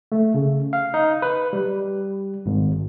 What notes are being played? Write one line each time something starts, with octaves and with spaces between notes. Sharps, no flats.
A3
C#3
F5
D#4
B4
G3
G#1